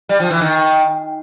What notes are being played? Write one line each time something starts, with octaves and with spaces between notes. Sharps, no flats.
G3
F3
E3
D#3